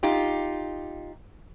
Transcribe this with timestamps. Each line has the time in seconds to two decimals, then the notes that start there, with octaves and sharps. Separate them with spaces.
0.03 D#4 F4 G4